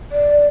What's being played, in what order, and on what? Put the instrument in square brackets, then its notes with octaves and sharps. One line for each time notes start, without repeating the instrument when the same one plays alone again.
[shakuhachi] D5